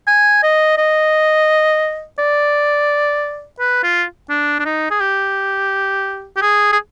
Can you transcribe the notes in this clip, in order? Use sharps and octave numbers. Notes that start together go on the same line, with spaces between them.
G#5
D#5
D#5
D5
B4
F4
D4
D4
D#4
G#4
G4
G4
G#4
G#4